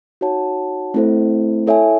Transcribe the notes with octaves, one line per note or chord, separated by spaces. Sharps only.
D#4 F#4 C#5 F#5 A5
A3 C4 E4 A4 C5
E4 A4 C#5 E5 G#5